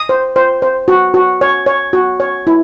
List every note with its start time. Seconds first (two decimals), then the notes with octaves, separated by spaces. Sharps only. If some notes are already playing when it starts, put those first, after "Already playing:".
Already playing: D#6
0.09 C5
0.36 C5
0.62 C5
0.88 F#4
1.14 F#4
1.41 C#5
1.66 C#5
1.93 F#4
2.20 C#5
2.47 E4